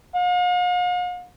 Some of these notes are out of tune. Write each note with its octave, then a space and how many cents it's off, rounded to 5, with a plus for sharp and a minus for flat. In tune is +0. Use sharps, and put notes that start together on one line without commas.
F5 +45